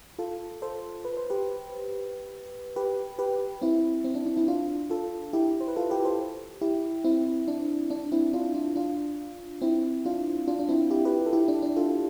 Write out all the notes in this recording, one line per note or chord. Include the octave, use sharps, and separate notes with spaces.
F4 A4
A4 C5
B4
C5
G4 B4
G4 B4
G4 B4
C4 E4
C4
D4
D4
C4 E4
D4 F4
F4 A4
E4 G4
C5
B4
F4 A4
G4 B4
A4 C5
E4 G4
C4 E4
D4
D4
C4 E4
D4 F4
D4 F4
D4 F4
C4 E4
D4 F4
D4 F4
D4
C4 E4
E4 G4
G4 B4
A4
E4 G4
D4
D4
F4 A4